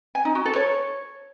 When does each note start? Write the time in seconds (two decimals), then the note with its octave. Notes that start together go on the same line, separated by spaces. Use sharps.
0.15 G#5
0.25 D#4
0.35 F#4
0.45 A4
0.56 C#5